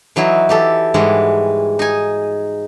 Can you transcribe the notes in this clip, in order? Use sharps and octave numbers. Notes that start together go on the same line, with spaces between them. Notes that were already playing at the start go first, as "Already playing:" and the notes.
E3 F#3 D#4 E4
E3 G4 A4
G#2 E3 G3 G#3 F#4
D#4 G#5